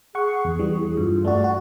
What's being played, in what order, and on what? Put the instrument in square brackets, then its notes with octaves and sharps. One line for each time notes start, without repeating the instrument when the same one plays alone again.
[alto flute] G#4 [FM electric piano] F#5 C#6
[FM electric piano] E2
E3 G3
[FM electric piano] G2 [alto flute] F4
[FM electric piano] A3 F#4 [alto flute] D5
[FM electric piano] F#4